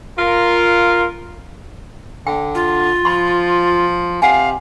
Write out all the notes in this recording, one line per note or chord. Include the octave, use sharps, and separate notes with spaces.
F4 A#4
D3 G5
F4
F3 B5 C6
C3 F5 F#5 G#5